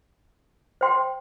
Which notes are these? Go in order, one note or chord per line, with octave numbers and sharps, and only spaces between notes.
C5 G5 C6